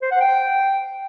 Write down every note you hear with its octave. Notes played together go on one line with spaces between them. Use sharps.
C5
F#5
G5